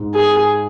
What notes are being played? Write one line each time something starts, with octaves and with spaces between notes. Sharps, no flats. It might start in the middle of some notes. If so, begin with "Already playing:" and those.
Already playing: G#2
G#4